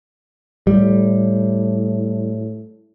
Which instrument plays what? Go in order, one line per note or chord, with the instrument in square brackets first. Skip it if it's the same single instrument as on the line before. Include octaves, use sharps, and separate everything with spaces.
[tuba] A2 [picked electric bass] G3